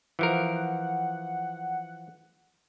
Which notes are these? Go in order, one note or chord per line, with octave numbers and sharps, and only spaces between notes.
E3 F3 A#4 F#5